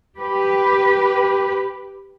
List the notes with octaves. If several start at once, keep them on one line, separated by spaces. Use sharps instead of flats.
G4 B4